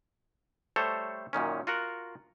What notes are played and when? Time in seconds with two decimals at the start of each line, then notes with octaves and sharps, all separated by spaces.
0.76 G3 A3 A4 C5 C#5
1.33 F#2 A#2 D#3 C#4
1.67 F4 F#4 A#4 F#5